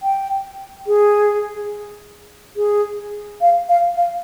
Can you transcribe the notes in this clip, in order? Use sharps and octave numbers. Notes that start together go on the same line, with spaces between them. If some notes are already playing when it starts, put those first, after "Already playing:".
G5
G#4
G#4
F5
F5
F5